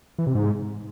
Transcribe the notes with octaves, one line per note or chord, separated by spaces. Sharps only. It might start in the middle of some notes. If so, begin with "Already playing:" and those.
E3
C3
G#2